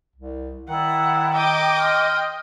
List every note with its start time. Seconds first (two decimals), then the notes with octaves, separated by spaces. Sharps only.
0.16 C2
0.69 D#3 E4 D5 F#5
1.35 D#5 G5 D6
1.77 C6 D#6 F6